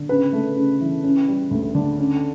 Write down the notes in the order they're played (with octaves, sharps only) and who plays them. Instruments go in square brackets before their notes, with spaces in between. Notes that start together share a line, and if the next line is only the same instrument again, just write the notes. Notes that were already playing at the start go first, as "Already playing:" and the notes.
Already playing: [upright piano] D3
C#3 B4
A3
C#3
E3
C#4
G3
D2
D3
C#4